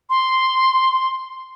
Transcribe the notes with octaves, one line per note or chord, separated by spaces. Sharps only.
C6